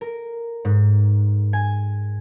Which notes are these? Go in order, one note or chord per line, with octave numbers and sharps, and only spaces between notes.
A#4
G#2
G#5